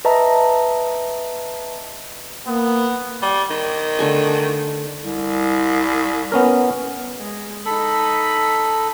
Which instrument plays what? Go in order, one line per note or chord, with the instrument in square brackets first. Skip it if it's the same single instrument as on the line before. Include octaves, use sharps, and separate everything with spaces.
[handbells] B4 D#5 E5 A5 A#5
[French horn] A#3 [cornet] B3
[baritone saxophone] G3
D#3
[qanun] D3 A3 G#5
[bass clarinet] C2
[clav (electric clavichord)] B3 C#4 A#4
[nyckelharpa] G#3
[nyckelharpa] D#4 B5 [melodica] A4